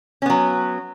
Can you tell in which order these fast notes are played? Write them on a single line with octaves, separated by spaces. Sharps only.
C#4 B3 F#3